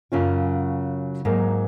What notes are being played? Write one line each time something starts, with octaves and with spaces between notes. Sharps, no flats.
F#2 C#3 F#3 C#4 F4
G#2 F#3 A#3